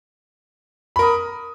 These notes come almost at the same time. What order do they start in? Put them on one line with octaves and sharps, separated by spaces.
B5 A#4 D#6